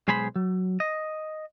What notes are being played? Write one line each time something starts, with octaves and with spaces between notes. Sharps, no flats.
B1 G#3 G#4 C5 B5
F#3
D#5